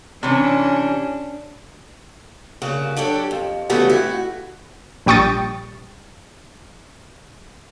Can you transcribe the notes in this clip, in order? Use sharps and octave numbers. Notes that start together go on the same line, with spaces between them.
C3 E3 C#4 D4
G2 C#3 A#3 F#4
F#3 D4 G4 A4 C#5
F2
C#3 E3 G3 A3 B3 F#4
F2 A3 E4 F#4
A#1 G3 G5 C#6 D#6 A6